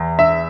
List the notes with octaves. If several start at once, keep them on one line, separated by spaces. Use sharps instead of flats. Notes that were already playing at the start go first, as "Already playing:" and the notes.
Already playing: E2
E5